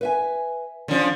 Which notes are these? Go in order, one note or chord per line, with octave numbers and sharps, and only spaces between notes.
B4 E5 G#5
D3 F3 C#4 D5